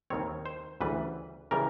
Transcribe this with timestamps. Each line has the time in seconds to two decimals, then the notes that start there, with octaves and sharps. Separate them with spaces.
0.10 D#2 D#3 G3 C4 C#5
0.46 C5
0.81 D2 C#3 E3 G3 B4
1.51 C#3 E3 G3 A#4